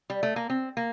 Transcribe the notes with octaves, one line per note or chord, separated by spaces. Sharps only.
G3
A3
A#3
C4
A#3